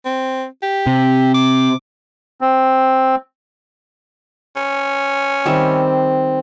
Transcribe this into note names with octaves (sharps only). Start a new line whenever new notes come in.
C4
G4
C3
D6
C4
C#4
D#3 G3 C4 E5